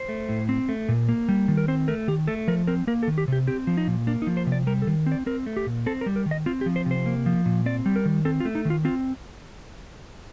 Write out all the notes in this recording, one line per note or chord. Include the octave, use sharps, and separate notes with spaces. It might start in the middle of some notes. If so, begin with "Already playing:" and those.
Already playing: C5
A3
A2
C4
A3
A#2
A#3
G3
D#3
A#4
C4 C5
A3 A#4
D#3 G4
A3 A4
F3 A#4
C4 A#4
A#3 A#4
A4
D#3
G4
C3 G4
C4 G4
F3
D#4
A#2
A#3 D4
D#4
F3
C5
C3
D5
G3 A#4
A4
D#3
C4
D5
C4 A#4
A3
G4
A#2
C4 A4
A#4
G3
A#4
D#3
D#5
C4 F4
G4
F3
C5
C3 C5
A#3
F3
A#2
C4 D5
G3
A#4
D#3
C4 A4
F4
A3
D#4
D#3 F4
C4 F4